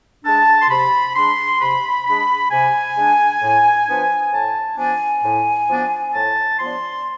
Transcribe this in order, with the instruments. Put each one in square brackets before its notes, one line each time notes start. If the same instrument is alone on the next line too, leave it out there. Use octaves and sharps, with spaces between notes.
[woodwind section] G#3 D4 A5
C6
C3 B5
G#3 D4 C6
C3 B5
G#3 D4 B5
C3 G#5
G#3 D4
A2
F3 B3 D4
A2 A5
F3 B3 D4 G#5
A2
F3 B3 D4
A2 A5
F3 B3 D4 C6